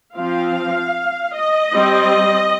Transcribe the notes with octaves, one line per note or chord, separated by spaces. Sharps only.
F3 C4 F5
D#5
G3 C4